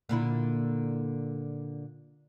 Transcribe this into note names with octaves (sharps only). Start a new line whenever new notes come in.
A#2 D3 E4